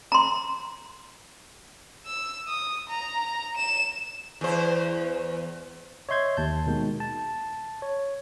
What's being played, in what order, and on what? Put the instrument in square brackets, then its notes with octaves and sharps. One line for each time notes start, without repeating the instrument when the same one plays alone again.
[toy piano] A#5 C6
[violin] E6
D#6
A#5
E7
[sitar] E2 C5
[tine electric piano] C#5 D#5 E5 C6 G6 G#6
D#2 A5 G6
B2 D#3 G#3
A5
C#5